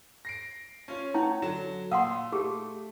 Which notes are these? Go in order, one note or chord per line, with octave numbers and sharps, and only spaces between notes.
A#6 C7 D7
C#4 F4 C#5
C#4 E4 C#5 F#5 A5
D3 F#3 E7
A#2 F5 F#5 C6 D#6 E6
A3 G4 G#4